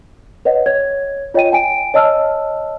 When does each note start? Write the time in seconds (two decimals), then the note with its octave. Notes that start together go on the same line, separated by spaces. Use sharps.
0.45 B4 C#5 D#5 F#5
0.66 C#5 G#6
1.34 F4 C#5 D#5 G5 G#5 D#7
1.52 G5 G#5 D7 D#7
1.94 C#5 D#5 A5 E6 F6